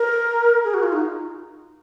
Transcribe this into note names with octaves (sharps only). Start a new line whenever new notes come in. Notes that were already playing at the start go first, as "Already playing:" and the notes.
Already playing: A#4
G#4
F#4
F4
D#4